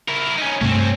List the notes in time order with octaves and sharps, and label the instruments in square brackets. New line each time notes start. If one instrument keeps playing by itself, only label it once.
[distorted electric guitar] E4 A#4
C#4 D#4
[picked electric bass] G2 C3 A3 [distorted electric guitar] C4 C#4